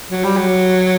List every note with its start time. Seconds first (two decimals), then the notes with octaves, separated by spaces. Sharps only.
0.10 F#3
0.24 G3
0.37 F#3